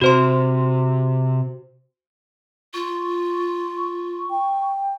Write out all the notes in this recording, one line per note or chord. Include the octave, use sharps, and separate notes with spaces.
C3 F#4 C5 C6
F4 C#6
G5